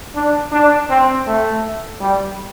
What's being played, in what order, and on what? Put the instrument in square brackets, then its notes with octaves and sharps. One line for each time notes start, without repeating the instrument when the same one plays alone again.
[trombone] D4
D4
C4
A3
G3